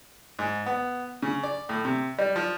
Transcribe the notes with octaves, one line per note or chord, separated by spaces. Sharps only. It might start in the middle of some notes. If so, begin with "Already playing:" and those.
G#2
B3
C#3
D5
A2
C3
G3
F3